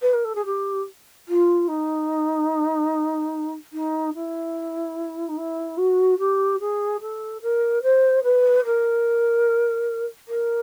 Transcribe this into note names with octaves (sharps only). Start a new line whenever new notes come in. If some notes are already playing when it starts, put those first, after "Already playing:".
B4
A#4
A4
G#4
G4
F4
D#4
D#4
E4
D#4
E4
F#4
G4
G#4
A4
A#4
C5
B4
A#4
A#4